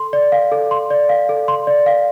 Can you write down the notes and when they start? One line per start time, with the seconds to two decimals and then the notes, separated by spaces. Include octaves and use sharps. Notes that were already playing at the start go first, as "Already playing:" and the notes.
Already playing: A4 C6
0.13 D5
0.32 F5
0.52 A4
0.71 C6
0.91 D5
1.09 F5
1.29 A4
1.48 C6
1.67 D5
1.86 F5